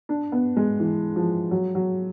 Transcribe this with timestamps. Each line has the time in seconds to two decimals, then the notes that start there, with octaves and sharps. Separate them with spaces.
0.09 D4
0.32 B3
0.57 G#3
0.80 E3
1.16 F3
1.51 F#3
1.75 F#3